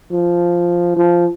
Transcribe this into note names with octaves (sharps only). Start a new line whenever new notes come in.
F3
F3